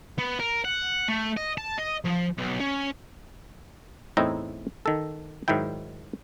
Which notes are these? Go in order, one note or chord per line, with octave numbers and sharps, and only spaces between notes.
B3
A#4
F#5
A3
D#5
A5
D#5
F3
B1
C#4
E2 A2 C4 D#4 E4 A#5
D#3 A4
G#2 D#3 F#3 E4 G5